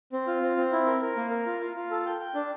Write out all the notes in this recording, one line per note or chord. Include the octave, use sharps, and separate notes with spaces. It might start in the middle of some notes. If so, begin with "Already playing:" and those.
C4
F4
C4
C4
E4
A#4
A#4
A#3
A#4
F4
F4
F4
A4
G5
G5
D4